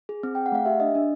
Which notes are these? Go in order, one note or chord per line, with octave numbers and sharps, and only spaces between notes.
G#4
C4
G#4 G5
F#5
A3 F5
G4 E5
D4 D#5
D4